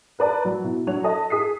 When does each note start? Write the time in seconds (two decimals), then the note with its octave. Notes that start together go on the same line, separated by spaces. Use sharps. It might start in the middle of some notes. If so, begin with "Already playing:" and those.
0.19 A#4 B4 D5 A5 A#5
0.45 F#3
0.63 B2 E4
0.87 F#3 D4 F#4 C#5 F7
1.04 A4 D#5 A5
1.30 G#4 D#6 B6 C7